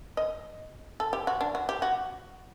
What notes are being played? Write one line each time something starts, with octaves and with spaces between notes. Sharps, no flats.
D#5
A4
G4
F#4
D4
F#4
G4
F#4